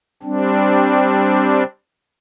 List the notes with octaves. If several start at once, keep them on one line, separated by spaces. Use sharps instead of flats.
G3 C4 D4